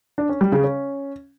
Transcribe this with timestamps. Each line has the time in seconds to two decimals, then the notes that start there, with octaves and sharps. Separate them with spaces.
0.18 D4
0.29 C#4
0.41 G3
0.52 C#3
0.64 C#4